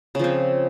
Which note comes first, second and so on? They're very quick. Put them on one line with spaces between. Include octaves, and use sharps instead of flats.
C#3 F3 C4